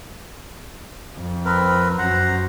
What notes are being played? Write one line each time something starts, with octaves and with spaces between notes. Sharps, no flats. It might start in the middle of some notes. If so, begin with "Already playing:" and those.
F2
C4 A#4 B4
F#2 C5 F#5 A#5